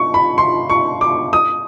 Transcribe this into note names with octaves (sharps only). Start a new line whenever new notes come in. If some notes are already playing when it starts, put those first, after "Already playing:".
Already playing: C#6
B5
C6
C#6
D6
D#6